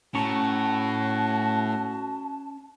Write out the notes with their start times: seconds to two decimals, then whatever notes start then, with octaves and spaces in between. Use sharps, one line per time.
0.15 A2 C#4 F#4 A5 A#5 C#6